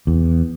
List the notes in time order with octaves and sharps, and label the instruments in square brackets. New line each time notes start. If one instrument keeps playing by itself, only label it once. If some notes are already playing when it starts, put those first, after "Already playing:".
[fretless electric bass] E2